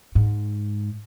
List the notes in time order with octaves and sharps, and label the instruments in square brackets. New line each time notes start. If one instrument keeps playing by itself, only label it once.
[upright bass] G#2